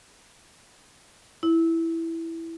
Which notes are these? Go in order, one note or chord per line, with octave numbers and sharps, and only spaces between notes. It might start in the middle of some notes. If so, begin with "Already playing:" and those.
E4